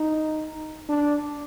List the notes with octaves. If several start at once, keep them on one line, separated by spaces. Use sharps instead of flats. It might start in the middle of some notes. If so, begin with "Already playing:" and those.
Already playing: D#4
D4